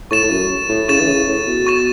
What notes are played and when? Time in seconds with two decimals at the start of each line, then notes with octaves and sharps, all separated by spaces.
0.11 A2 C#6 A6 E7
0.23 A2
0.30 F#2
0.69 A2
0.88 C#3 C#6 A6 E7
1.00 E3
1.08 C#3
1.27 A2
1.47 B2
1.67 C#6 A6 E7